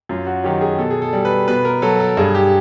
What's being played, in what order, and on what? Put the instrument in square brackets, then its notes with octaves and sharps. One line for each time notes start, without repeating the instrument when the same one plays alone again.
[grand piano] F#2 F4
F#4
D#3 F#3 G4
G#4
B2 A4
G#4
A4
G3
B4
B2 B4
A#4
F#3 A4
A4
G2 G#4
G4